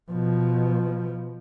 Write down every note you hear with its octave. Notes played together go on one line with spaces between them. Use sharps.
B2 F3